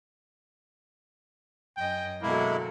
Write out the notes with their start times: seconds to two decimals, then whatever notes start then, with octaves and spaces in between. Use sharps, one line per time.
1.77 F#2 D#5 G5 G#5
2.22 B2 D3 F#3 G#3 A#3 E4